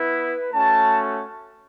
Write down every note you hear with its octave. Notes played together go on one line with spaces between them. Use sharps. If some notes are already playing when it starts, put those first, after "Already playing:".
Already playing: B3 E4 B4
A3 C#4 F#4 A5